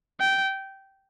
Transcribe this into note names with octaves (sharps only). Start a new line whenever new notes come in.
G5